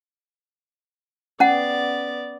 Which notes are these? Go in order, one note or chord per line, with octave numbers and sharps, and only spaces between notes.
B3 C#4 D5 F#5